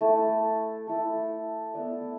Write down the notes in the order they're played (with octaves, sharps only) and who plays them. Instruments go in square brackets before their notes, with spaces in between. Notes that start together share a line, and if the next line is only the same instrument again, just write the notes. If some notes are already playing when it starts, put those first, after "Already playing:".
[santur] A3 E4 A4
A3 E4 A4
B3 E4 B4 D5